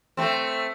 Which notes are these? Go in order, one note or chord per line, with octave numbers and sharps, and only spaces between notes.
A3 C4